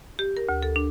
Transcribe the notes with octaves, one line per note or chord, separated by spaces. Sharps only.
G4
A#4
D2
A4
D4